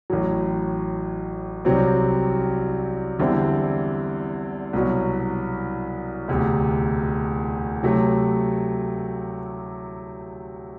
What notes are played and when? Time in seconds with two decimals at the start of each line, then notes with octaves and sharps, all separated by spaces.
0.10 A1 A2 F#3
1.65 C2 C3 F#3 C4
3.19 E2 D3 G3 C4 E4
4.73 C2 B2 F#3
6.28 E1 D2 C3
7.83 C3 F#3 A3